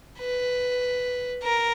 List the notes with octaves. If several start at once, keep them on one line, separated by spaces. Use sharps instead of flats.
B4
A#4